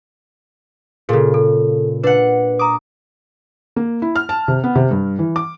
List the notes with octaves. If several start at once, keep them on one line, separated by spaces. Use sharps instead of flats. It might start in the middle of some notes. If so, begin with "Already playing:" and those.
A#2 C#3 G#4 A4
A4
D4 B4 F#5
A#5 D6 D#6
A#3
E4
F6
A5
C3
B3
C3
G2
E3
D6